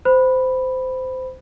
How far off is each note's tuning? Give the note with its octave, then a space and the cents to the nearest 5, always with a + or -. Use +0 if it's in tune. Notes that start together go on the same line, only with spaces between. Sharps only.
C5 -20 B5 +0